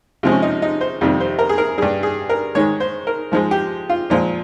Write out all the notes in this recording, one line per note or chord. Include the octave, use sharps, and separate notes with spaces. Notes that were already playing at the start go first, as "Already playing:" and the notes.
C3 F3 G#3
C#4
D#4
D#4
C5
F2 C3 D#3 G3
C5
A#4
G#4
A#4
G2 G3 G#4
G#4
A#4
G#2 D#3 G#3 C#5
C5
A#4
G#2 F3 G#3
G4
F4
A#2 F3 G#3